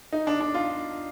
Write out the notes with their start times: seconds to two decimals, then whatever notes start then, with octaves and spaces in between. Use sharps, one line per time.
0.12 D#4
0.27 D4
0.40 D4
0.54 F4